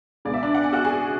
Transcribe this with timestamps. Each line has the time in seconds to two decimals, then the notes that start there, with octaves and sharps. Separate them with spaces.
0.25 C#2 B2 G#3 D5
0.34 E5
0.43 D4 D5
0.54 F#5
0.64 G#5
0.73 F#4 F#5
0.85 G#4 G#5